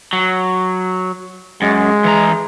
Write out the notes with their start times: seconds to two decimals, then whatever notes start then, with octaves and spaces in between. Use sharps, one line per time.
0.13 F#3
1.62 F#2 G#3
2.05 E3 A#5